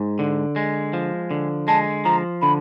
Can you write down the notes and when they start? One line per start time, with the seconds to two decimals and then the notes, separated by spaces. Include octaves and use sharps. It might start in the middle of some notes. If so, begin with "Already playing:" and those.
Already playing: G#2
0.19 D3
0.56 G#3
0.93 F3
1.31 D3
1.68 G#3 A5
2.05 F3 A#5
2.42 D3 B5